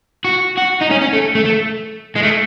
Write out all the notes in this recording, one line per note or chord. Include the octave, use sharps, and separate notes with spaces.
F#4
F#4
D#4
C#4
C#4
A3
A3
A3
G#3
A3